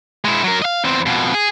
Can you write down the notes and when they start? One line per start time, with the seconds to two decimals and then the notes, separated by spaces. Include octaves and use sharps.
0.25 G#3 E4
0.44 F#3 A#4
0.62 D#5 F5
0.84 E2 C4
1.06 F2 B2
1.34 G#4